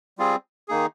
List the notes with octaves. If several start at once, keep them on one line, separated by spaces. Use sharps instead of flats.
G3 C4 F4 G#4
D#3 A#3 D#4 G#4